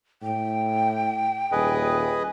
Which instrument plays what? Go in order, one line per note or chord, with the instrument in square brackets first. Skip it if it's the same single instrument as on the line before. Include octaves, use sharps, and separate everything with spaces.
[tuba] A2 [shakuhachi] G5
[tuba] D#1 [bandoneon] G#4 B4 D#5